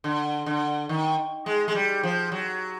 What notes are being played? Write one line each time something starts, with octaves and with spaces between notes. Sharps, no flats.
D3
D3
D#3
G#3
G#3
G3
F3
F#3